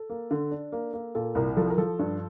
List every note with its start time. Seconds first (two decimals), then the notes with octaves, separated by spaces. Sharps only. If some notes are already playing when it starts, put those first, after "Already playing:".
Already playing: A4
0.09 A#3
0.31 D3
0.51 D4
0.72 A#3
0.93 A#3
1.15 A#2 A4
1.35 C2 A#4
1.57 F3 A4
1.70 A#4
1.78 F3 A4
1.99 G2